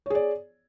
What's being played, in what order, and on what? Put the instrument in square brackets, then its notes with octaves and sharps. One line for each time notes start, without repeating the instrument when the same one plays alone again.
[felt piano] C#5
G#4
D5